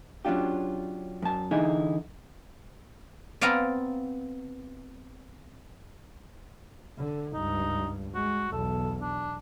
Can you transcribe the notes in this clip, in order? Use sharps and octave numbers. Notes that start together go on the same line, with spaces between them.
F#3 C#4 D4 F4 G4
F#2 A5
D3 E3 D#4 E4 G#4
B3 C4 D5 F5 G#5 A#5
D3
C#2 G2 D#4
G#3 F#4
B1 E2 A4
D4